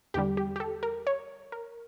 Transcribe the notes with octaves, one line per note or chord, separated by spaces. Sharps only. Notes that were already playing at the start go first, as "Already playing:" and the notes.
E2 D3 G3 G4
G4
G4
A4
A#4
C#5
A#4